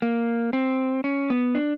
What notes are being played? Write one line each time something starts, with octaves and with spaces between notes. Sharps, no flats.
A#3
C4
C#4
B3
D4